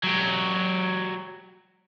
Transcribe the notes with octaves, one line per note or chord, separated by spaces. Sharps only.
F#3 G4